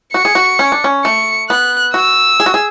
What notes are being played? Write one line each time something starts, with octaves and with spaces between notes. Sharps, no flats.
F#4 C#7
G#4
F#4
C#4
D4
C#4
A3 C#7
B3 F#6
F#4 E6
G#4
F#4
G#4